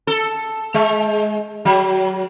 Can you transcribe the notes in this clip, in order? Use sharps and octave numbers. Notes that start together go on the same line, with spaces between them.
A4
G#3
F#3